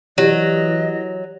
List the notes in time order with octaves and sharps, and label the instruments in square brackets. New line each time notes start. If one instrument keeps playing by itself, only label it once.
[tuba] E3 [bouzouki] F#3 [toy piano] G4 [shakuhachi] D#5